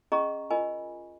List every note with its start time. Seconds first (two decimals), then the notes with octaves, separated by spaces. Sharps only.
0.12 C#4 G#4 D#5 A#5 C#6
0.50 F4 A#4 D#5 G#5 B5